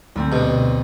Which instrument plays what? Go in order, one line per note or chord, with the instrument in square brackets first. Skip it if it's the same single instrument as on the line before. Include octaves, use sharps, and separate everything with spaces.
[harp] D2 A3 C4
[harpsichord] G2 B2